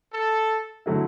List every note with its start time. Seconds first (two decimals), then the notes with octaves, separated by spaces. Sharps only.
0.12 A4
0.86 D3 F#3 A3 E4